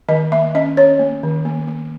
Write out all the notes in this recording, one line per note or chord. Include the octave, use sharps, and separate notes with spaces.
D#3 D#5
A#3 E5
C#4 D#5
C#4 C#5
A#3
D#3
A#3
A#3